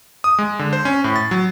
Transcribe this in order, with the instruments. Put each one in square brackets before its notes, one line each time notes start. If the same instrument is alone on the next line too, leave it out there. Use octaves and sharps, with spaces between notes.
[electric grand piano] D#6
G#3
D3
C5
C#4
A2
A6
F#3